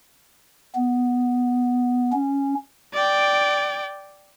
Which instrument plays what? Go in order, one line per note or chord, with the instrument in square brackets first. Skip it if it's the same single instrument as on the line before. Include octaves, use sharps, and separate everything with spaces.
[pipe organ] B3
C#4
[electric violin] D5 G5